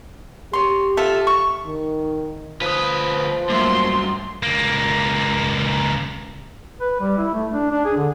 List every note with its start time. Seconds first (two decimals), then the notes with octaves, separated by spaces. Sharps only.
0.53 G4 C#5 C6
0.97 F4 A4 E5
1.27 C#6
1.66 D#3
2.62 D2 F3 B4 D#6 F#6 B6
3.50 G2 F#3 A3 A#3 E5 C6
4.43 C#2 A#3
6.81 B4
7.01 G3
7.18 E4
7.34 A3
7.52 D4
7.72 D4
7.85 G#4
7.97 D3